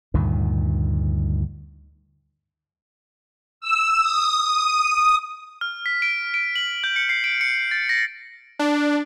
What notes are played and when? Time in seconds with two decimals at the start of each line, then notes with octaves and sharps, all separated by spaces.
0.14 D2 G2 A#2 D#3
3.61 E6
4.01 D#6
5.61 F6
5.86 B6
6.02 D7
6.34 D7
6.56 F#7
6.84 G6
6.96 C#7
7.09 C7
7.24 D7
7.41 C#7
7.71 A6
7.89 A#6
8.59 D4